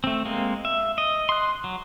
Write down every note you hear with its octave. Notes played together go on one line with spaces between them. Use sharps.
A3 C4
G#3 A#3 C4
E5
D#5
C6 F#6
F#3